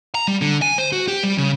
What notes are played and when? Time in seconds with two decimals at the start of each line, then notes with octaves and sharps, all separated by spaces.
0.15 A#5
0.28 G3
0.41 D3
0.62 G#5
0.78 C5
0.93 F#4
1.08 G4
1.23 G3
1.38 C#3